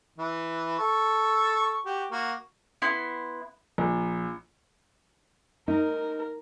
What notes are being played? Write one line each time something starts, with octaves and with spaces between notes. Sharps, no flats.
E3
A4 C#6
F#4 G4
A#3 F#4
B3 E4 C6
A#1
D#4 A#4